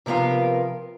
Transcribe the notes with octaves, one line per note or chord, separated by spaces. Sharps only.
C3 F3 B3 A#4 F5